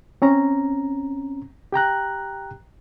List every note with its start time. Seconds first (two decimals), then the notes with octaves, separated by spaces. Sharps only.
0.22 C4 C#4 A#5
1.73 G4 G5 A#5 F#6